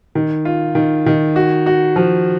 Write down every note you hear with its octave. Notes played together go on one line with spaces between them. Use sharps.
D#3
F4
D#3
D#3
F#4
F#4
F3